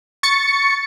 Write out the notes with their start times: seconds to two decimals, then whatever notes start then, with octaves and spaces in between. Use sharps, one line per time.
0.23 C#6 A6 C#7